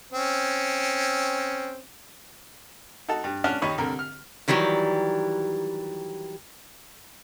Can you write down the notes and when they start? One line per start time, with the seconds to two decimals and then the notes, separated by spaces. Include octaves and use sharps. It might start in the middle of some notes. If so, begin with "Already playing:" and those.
0.12 C4 C#4
3.09 D#4 F#4 A4
3.24 G2
3.44 C#4 D4 F#5 F6
3.62 D#2 D#4 C#5 D#5 B5
3.78 C2 D3 A#4
3.99 F6
4.48 D#3 E3 F#3 G3 G4